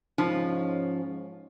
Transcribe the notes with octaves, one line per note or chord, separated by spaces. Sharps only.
G#2 F3 C#4 D#4 F4